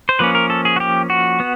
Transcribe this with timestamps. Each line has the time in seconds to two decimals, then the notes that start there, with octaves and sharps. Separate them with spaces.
0.09 C5
0.19 F3 A#3 C#4 B4
0.35 A#4
0.50 A4
0.65 G#4
0.76 F#4
0.80 G4
1.10 F#4
1.40 B3